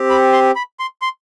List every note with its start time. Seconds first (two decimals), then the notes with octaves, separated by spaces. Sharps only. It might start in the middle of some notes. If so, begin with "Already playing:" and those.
Already playing: C4 G4
0.10 B5
0.33 C6
0.56 B5
0.79 C6
1.02 C6